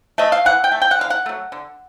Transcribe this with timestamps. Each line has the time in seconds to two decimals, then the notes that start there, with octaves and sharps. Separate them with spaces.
0.18 A3 D#5
0.32 F5
0.45 E3 F#5
0.64 G5
0.72 A3
0.82 G5
0.91 F#5
0.99 D3 F5
1.10 F#5
1.26 F#3 A3
1.52 D3